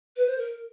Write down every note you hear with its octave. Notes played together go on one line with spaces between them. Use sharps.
B4
C5
A#4